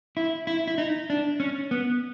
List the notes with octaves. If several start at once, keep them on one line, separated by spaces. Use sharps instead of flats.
E4
E4
E4
D#4
D4
C#4
B3